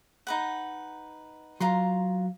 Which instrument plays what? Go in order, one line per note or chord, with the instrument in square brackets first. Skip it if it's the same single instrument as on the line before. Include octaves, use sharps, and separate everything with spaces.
[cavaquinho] D#4 B4 F#5
[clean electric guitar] F#3 [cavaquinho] F4 A#5 C6